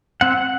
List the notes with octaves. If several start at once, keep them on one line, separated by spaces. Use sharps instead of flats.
C4 F#5